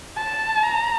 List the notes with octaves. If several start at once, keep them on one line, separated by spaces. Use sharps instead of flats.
A5
A#5